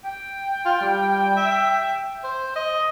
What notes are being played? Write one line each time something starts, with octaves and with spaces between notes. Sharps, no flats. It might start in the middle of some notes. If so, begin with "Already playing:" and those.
G5
F4
G3
E5
C5
D#5